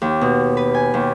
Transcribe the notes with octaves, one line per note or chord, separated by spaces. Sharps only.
D#2
B2
B4
G#5
D#2